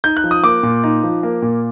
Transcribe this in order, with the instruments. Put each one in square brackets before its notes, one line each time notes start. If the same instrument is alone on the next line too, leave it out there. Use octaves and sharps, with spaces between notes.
[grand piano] D#4 G6
F#6
F3
D#6
A#3 D6
A#2
D#4
F3
A#3
A#2